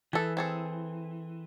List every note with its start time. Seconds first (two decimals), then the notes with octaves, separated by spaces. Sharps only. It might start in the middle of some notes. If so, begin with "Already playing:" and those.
0.13 E3 G#4 A4
0.37 C4 G#4 A4